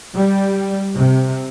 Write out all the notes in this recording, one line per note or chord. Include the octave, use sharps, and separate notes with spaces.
G3
C3